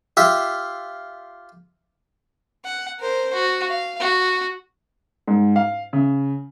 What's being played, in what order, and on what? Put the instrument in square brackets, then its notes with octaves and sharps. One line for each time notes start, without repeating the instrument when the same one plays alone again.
[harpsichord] F4 G4 E5
[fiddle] F#5
A#4 C5
F#4
F5
F#4
[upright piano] G#2
F5
C#3